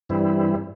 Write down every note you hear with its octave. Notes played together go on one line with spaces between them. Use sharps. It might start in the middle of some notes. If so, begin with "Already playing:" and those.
G2 E3 G3 C4 E4